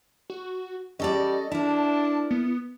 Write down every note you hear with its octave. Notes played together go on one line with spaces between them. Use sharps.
F#4
G3 C#4 A4 D5 D#5
D4 E4 A#4 A5
B3